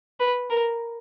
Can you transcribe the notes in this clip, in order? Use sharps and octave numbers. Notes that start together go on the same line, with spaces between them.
B4
A#4